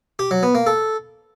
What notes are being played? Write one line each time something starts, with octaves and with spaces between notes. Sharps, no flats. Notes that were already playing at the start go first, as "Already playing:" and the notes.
G4
F#3
B3
A#3
A4